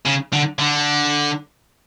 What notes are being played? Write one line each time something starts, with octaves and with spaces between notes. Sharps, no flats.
C#3
D3
D3